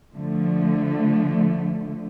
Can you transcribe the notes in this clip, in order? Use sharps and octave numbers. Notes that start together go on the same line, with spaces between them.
D3 F3 A3